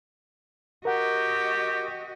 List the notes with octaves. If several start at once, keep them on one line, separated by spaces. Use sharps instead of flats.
F#4 G4 A#4 D#5 F#5